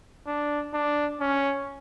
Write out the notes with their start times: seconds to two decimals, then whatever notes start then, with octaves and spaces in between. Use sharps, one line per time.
0.27 D4
0.74 D4
1.21 C#4